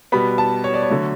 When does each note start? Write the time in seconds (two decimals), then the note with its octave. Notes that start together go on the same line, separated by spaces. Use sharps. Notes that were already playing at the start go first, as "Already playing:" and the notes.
0.12 B2 G3 B3 B5
0.38 A5
0.64 C#5
0.74 D5
0.82 C#5
0.90 D3 F#3 A3